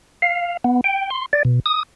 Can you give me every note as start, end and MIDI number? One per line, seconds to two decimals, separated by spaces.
0.22 0.57 77
0.64 0.81 59
0.84 1.10 79
1.10 1.26 84
1.33 1.43 74
1.45 1.60 47
1.66 1.83 87